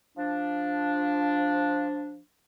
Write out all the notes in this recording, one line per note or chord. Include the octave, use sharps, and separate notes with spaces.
F3 D4